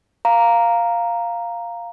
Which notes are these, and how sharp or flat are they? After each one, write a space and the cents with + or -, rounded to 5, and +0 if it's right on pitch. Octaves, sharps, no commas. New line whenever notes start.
F5 +0 A#5 +0